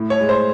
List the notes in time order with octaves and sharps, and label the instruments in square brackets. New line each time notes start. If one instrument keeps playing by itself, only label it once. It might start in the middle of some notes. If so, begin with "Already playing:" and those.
Already playing: [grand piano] A2
C#5
G#3
C5